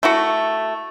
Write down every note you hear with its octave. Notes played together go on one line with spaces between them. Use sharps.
A3 E4 F#4